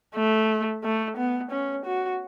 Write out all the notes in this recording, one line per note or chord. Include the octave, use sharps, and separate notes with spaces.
A3
A3
B3
C#4
F#4